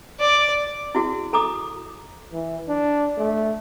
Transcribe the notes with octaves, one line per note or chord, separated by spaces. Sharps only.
D5
E4 F#4 G#4
A4 A#5 D6 D#6
E3
D4
A3